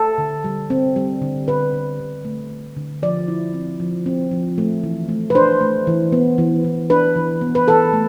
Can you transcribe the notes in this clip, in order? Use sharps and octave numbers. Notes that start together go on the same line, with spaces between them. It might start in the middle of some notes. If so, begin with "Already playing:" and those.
Already playing: A4
D3
G3
C4
G3
D3
D3 B4
D3
D3
A3
A3
D3
F3 D5
E4
C4
F3
C4
F3
A3
E3
A3
B4
D4 C5
A3
E3
B3
E3
E3
D4 B4
E3
B3
B4
E3 A4
A3